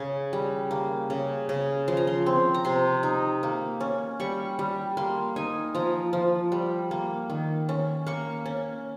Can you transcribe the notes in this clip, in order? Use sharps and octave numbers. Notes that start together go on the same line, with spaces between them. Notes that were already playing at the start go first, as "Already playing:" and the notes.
Already playing: C#3
G3
A#3
C#3
C#3
F3 C6
A#5
C6
C4
A#5
C3 C6
D#4
A#3
C#4
G3 C#6
G3
A#3 C6
D#4 G#5
F3 A#5
F3
G3
A#3
D#3
C#4
A#3 C#6
C#4